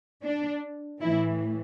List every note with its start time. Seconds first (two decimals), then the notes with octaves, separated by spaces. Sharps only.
0.24 D4
1.02 A2 E3 E4